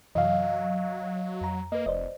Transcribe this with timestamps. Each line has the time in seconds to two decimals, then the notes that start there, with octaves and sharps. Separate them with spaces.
0.15 F#2 C3 E3 F#3 D#5 F5
1.41 F2 A#5
1.72 A#3 B4 D#5
1.86 F1 C5 D5 D#5